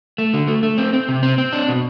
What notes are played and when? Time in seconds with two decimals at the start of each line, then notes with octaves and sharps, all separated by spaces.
0.18 A3
0.34 D3
0.48 A3
0.63 A3
0.78 C4
0.93 C4
1.09 C3
1.23 C4
1.38 C4
1.53 D4
1.69 B2